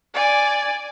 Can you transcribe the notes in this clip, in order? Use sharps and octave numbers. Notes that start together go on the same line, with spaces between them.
D5 G#5